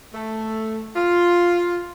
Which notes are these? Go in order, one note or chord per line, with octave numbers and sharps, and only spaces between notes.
A3
F4